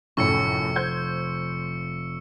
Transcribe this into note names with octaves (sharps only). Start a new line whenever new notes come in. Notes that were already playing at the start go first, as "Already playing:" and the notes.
F1 F#2 A2 C#6 E6 C#7
C5 G6 G#6